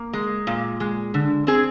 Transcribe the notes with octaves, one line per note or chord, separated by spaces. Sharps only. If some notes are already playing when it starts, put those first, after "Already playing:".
Already playing: A#3
G#3
A#2
G#3
D3
C4 G#4